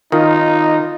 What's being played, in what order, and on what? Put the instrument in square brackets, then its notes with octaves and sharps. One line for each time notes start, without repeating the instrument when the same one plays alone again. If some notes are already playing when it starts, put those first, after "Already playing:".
[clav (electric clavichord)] D#3 [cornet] D#4 [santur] F4